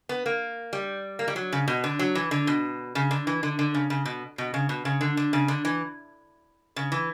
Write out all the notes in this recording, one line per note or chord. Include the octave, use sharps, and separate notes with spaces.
B3
A#3
G3
A#3
G3
F#3
C#3
B2
D3
F#3
E3
D3
B2
C#3
D3
E3
D3
D3
C#3
C#3
B2
B2
C#3
B2
C#3
D3
D3
C#3
D3
E3
C#3
E3